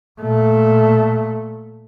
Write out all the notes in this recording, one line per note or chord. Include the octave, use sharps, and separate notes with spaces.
A#2 A3